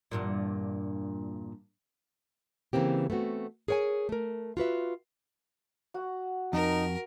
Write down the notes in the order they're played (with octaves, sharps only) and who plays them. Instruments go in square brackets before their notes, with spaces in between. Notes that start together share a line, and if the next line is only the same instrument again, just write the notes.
[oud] E2 G2 A#2
[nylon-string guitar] C#3 E3 A#3 C4 G4
A3 B3 C4 F#4
G#4 A#4 C#5 F#5 G#5
A3 A#4
F4 F#4 B4 E5
[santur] F#4 F#5
[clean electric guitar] F2 [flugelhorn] D#4 [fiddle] A#4